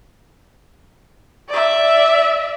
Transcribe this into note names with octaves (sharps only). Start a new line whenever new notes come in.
D5 E5